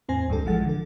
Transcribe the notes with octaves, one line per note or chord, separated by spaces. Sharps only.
E2 A2 C4 C5 G#5 A#6
D2 G2 G3 A4
A#1 E3 F3 G#3 F#5 A6
D3 A4